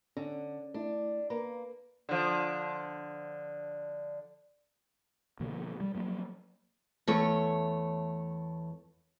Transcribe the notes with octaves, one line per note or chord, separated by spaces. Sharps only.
D3 C#4
A3 D4 E4
A#3 B4
D3 F3
B2 D3 F3 A#3
G3
F3 F#3 A#3
E2 A3 C#5